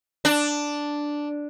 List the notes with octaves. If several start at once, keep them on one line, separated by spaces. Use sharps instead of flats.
D4